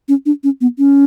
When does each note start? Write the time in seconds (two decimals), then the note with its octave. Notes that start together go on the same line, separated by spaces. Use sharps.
0.08 C#4
0.26 D4
0.44 C#4
0.61 B3
0.78 C#4